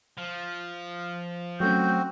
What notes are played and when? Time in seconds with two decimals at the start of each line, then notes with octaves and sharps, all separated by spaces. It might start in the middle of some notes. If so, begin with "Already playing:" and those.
0.18 F3
1.60 F#3 A3 C4 C#4 F#4 G6